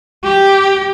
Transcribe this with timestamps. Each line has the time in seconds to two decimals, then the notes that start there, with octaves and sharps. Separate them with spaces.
0.24 G4